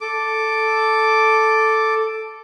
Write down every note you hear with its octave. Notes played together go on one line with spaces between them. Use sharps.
A4 D6